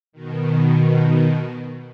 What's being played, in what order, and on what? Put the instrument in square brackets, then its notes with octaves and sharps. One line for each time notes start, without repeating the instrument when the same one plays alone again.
[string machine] B2 D#3